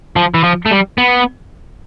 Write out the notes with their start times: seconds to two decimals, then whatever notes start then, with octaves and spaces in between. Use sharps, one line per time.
0.16 F3
0.34 E3
0.44 F3
0.66 A3
0.71 G3
0.98 B3